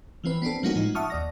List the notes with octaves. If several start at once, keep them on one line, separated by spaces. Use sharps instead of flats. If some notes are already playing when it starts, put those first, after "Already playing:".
E3 F3 C4 B4
B3 C4 D4 A4
F3 G3 A#3 C#4 D#4 F#4
A2 F3 G#3 D#4
E5 F#5 A5 C#6 D#6 F6
D#2 D5 A#6